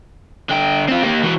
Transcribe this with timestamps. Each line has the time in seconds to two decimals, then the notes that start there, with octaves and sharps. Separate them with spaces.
0.50 D3 G5
0.88 C4 F4
1.03 A#3 G4
1.23 E3 F#4